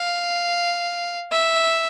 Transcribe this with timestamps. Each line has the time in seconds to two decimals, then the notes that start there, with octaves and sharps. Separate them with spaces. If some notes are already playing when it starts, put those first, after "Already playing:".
Already playing: F5
1.32 E5